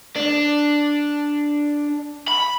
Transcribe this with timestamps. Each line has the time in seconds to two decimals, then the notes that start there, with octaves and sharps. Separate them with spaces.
0.16 D4
2.28 B5